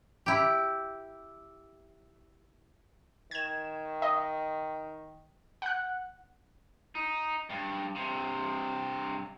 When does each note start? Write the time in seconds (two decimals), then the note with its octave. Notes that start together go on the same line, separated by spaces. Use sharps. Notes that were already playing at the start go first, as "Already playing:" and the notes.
0.26 E4 G4
3.31 D#3 G#6 E7
4.02 D#5
5.62 F#5 F#6
6.95 D#4
7.50 G2
7.96 G2 C3